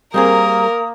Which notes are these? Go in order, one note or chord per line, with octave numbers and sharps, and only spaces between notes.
G3 A#3 C4 G#4 A#4 D#6